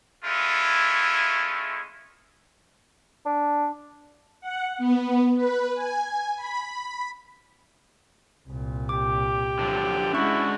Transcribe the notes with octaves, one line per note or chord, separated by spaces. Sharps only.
G#3 A3 C#4 E4 F4
D4
F#5
B3
B4
G#5
B5
C2 A#2
G4 D6
D3 F3 F#3
G#3 C#4 D4 E4 F#4 C#6